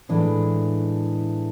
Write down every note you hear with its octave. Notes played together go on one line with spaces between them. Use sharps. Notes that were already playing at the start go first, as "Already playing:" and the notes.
A2 E3 G#3 D4